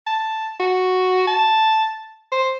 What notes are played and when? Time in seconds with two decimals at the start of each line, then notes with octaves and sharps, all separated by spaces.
0.06 A5
0.59 F#4
1.27 A5
2.32 C5